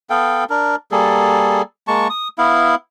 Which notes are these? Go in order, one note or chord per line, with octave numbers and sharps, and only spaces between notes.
B3 A4 F5 G5
D4 A#4
G3 A#3 G#4 A4
G#3 A#3 A5 C#6
D#6
B3 E4 F5